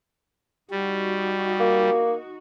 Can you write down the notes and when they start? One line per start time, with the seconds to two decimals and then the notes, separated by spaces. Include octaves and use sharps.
0.71 G3 D#4 F#4
1.60 A#3